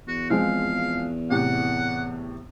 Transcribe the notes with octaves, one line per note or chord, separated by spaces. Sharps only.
E2 F#4
F3 G#3 C4 F5
A2 C3 G4 F#5